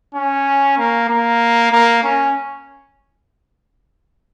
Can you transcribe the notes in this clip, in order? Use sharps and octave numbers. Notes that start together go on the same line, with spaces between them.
C#4
A#3
A#3
A#3
C#4